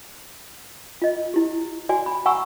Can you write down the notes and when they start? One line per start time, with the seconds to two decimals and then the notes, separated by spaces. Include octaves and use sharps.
1.02 F4 D#5
1.34 E4 G4
1.89 F#4 D5 G#5
2.06 B5
2.26 F#5 G#5 A#5 C#6 D#6 E6